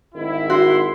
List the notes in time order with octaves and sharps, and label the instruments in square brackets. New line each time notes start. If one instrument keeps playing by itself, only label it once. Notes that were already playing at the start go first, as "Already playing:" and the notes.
[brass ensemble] G#1 E4
[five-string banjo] F#4 [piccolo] C6